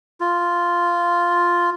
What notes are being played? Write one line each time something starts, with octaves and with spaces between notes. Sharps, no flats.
F4